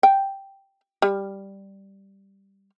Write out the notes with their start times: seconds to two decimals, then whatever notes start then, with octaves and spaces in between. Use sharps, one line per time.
0.03 G5
1.02 G3